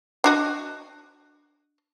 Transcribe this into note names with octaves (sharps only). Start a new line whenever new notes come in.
D4 F#4 D#5